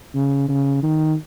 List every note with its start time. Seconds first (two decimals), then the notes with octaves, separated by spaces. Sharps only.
0.15 C#3
0.48 C#3
0.83 D#3